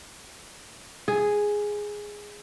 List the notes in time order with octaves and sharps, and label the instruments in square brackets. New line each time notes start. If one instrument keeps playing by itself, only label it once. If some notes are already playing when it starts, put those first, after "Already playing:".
[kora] G#4